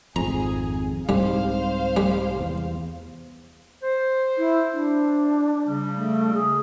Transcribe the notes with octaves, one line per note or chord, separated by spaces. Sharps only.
G#1 F2 G#4 A#5
C2 G#2 G3 C5 F5
G3
E2
C5
E4
D4
C#3 G3
A3
G#4